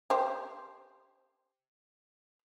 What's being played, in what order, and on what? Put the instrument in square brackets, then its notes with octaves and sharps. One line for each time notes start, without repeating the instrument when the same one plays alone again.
[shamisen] G4 C5